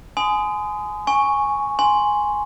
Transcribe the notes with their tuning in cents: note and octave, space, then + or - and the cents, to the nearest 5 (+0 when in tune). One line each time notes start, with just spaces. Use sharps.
G#5 +20 C6 -35 D#6 +0
G#5 +0 C#6 -5
G#5 +0 C6 +0